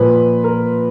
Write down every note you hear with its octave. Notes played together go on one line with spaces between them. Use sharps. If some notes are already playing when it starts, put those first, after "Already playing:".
Already playing: A#2 F3 B4
A#4